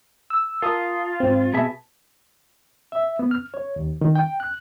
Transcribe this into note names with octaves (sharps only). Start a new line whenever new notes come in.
E6
F4 A#4 A5 D#6
G#2 C4
B2 G#4 E5 A5
E5
B3
F6
C#5
D#2
D#3
G5
F#6